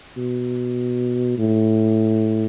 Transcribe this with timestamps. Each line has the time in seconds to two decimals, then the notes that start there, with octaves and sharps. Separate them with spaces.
0.17 B2
1.38 A2